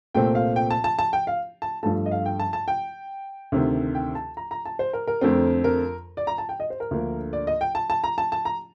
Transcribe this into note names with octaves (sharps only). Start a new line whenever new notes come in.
C2 A#2 A3 C4 G5
F5
G5
A5
A5
A5
G5
F5
A5
G2 F3 A3 A5
D#5
F5
G5
A5
A5
G5
D2 C3 D#3
G5
A5
A#5
A#5
A5
C5
A#4
A#4
F2 D3 A3 C4
A#4
D5
A#5
A5
G5
D#5
C5
A#4
D2 D3 F3 A#3
D5
D#5
G5
A5
A5
A#5
A5
A5
A#5